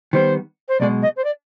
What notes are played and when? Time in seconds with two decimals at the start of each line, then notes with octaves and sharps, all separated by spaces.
0.13 D#3 G3 B3 C5
0.68 C5
0.80 B1 B2 G#3 D5
1.02 D#5
1.16 C5
1.24 D5